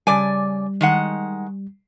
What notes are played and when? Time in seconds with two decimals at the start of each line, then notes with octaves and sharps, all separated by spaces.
0.07 C#3 G3 D5 G#5
0.81 D#3 G#3 F#5